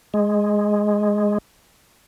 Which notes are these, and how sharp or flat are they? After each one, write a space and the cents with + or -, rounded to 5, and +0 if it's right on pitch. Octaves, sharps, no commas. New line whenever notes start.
G#3 +0